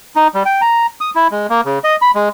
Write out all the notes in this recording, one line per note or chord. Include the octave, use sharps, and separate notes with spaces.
D#4
G3
G5
A#5
D#6
E4
G#3
A#3
C#3
D#5
B5
G#3